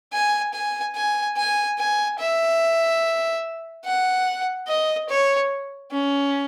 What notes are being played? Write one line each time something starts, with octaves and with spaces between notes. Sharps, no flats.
G#5
G#5
G#5
G#5
G#5
E5
F#5
D#5
C#5
C#4